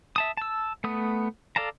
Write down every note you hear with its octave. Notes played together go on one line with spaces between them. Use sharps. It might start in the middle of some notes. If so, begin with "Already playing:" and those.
E5 A5 D#6
A5 E6
A3 B3 D#6
A4 D5 F5 A5 A#5